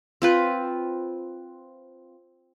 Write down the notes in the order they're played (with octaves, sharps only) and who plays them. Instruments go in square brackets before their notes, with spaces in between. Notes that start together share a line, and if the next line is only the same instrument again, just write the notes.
[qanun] C4 F4 B4